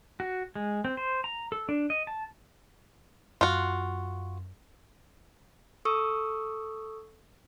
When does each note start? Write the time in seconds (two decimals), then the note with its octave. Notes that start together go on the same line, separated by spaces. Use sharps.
0.20 F#4
0.55 G#3
0.85 C4
0.97 C5
1.24 A#5
1.52 A4
1.69 D4
1.90 D#5
2.07 A5
3.41 F#2 F4 F#4
5.85 A4 C#6 D#6 E6